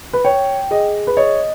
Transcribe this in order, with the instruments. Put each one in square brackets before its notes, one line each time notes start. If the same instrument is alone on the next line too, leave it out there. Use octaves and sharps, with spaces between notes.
[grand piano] B4
[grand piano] C#5 [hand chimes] G5
[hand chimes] G#4 [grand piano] D#5
[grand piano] B4
[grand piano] C#5 [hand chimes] D#5